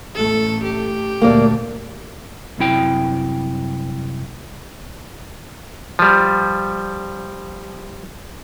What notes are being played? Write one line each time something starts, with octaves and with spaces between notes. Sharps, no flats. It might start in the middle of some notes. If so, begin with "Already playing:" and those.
A1 A3 A4
G4
D2 A#2 A3 A#3 D5
C2 F#2 C3 E4 G5
F3 G3